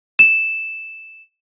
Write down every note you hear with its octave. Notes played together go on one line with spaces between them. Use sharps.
E7